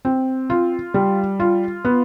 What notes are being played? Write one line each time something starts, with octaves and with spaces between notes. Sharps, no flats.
C4
F4
G3
F4
B3